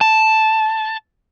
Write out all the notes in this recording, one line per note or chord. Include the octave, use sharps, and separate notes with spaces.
A5